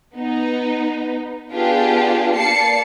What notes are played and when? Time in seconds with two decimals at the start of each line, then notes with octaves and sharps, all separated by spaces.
0.16 B3 D#4
1.53 B3 D4 F4 G4 G#4
2.36 A#3 D5 A5 C7 C#7